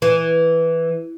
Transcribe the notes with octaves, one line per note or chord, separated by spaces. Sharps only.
E3